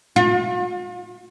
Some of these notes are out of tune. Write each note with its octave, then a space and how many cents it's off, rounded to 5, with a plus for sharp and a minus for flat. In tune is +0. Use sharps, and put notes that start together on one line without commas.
F4 +45